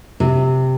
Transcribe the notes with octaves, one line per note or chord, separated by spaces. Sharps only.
C3